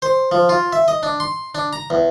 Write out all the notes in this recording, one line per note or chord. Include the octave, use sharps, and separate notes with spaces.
C5
F3
F4
E5
D#5
D4
C6
D4
A#5
E2